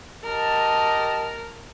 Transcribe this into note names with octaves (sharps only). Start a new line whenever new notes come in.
G4 A#4 D#5 A5